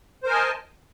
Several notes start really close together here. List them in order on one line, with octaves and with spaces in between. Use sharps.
C5 A#4 G#5 D#5 A5